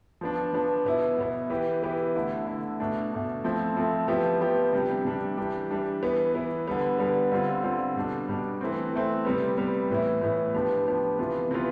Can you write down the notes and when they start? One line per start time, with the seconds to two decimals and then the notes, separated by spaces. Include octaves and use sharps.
0.21 F3 B3 D4
0.53 F3 B3 D4
0.85 B2 B3 E4
1.18 B2 B3 E4
1.50 E3 B3 E4 G4
1.82 E3 B3 E4 G4
2.15 D3 A3 E4
2.47 D3 A3 E4
2.80 B2 A3 D4
3.12 B2 A3 D4
3.44 F3 A3 C4 E4
3.77 F3 A3 C4 E4
4.08 F3 B3 E4 G4
4.41 F3 B3 E4 G4
4.73 C3 G3 D4 G4
5.05 C3 G3 D4 G4
5.37 E3 G3 D4 G4
5.70 E3 G3 D4 G4
6.03 E3 B3 E4
6.35 E3 B3 E4
6.67 D3 G3 B3
6.99 D3 G3 B3
7.32 D3 G3 C4 F4
7.63 D3 G3 C4 F4
7.96 B2 G3 D4
8.28 B2 G3 D4
8.61 E3 A3 C4
8.93 E3 A3 C4
9.25 C3 G3 B3
9.57 C3 G3 B3
9.90 A2 E3 B3 E4
10.21 A2 E3 B3 E4
10.54 F3 B3 D4 G4
10.87 F3 B3 D4 G4
11.19 C3 E3 B3 F4
11.51 C3 E3 B3 F4